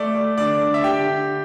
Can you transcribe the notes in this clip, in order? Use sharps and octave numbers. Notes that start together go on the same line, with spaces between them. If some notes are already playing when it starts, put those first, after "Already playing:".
Already playing: A3 D5
A3
D3 D5
D3
E5
D3 G4 G5
D3